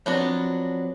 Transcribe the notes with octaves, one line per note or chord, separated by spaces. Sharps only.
F3 F#3 B3 C4 D4 F#4